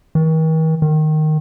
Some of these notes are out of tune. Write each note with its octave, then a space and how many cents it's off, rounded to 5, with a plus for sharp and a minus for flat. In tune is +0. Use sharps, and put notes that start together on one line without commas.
D#3 +45
D#3 -10